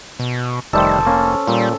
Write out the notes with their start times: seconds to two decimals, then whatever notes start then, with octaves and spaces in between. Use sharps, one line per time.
0.20 B2
0.73 F1 D#3 G3 A3 A4 C5
1.07 A#3 C#4
1.47 A#2 G3